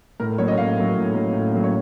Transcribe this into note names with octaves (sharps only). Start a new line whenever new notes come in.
A2 A#4
F#3 A#3 C#4 C#5
D#5
A2 F5
F#3 A#3 C#4
A2
F#3 A#3 C#4
A2
F#3 A#3 C#4
C#5